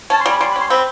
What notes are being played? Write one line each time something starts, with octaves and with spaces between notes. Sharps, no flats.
C#4 A5
C6
G3 B5
G3 C6
B5
C#4 C6
C4 B5